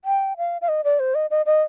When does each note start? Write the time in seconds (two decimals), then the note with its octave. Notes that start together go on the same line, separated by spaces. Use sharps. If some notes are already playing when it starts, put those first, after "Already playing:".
0.05 G5
0.37 F5
0.62 F5
0.68 D#5
0.84 D5
1.00 C5
1.15 D#5
1.30 D#5
1.46 D#5